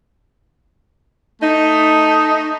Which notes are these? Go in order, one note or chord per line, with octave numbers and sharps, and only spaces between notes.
A3 D#4